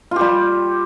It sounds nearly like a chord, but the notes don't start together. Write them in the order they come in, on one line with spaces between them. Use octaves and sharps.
F4 G4 G3